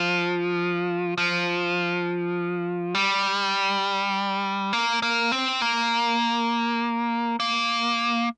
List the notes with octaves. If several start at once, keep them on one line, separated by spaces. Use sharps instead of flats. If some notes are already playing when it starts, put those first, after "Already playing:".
Already playing: F3
F3
G3
A#3
A#3
C4
A#3
A#3